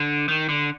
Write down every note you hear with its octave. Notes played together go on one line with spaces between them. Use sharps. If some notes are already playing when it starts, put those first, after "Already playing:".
Already playing: D3
D#3
D3